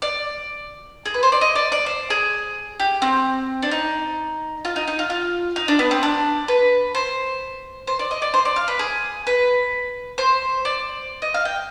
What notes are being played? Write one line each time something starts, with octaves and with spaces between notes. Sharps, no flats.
D5
G#4
B4
C5
D5
D#5
D5
D5
C5
G#4
G4
C4
D4
D#4
F4
D#4
D#4
F4
F4
D#4
D4
B3
C4
D4
B4
C5
C5
D5
D#5
D5
C5
D5
F5
B4
G#4
B4
C5
D5
D#5
F5
G5